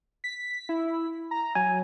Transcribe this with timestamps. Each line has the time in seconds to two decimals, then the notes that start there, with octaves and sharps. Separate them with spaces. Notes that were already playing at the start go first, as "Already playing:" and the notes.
0.24 B6
0.69 E4
1.31 A#5
1.55 F#3 G#5